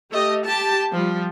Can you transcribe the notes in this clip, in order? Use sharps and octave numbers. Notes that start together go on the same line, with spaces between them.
A3 G4 D#5
G4 A5
F3 G3